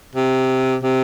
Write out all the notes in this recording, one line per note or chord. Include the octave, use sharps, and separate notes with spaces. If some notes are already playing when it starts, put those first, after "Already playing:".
C3
C3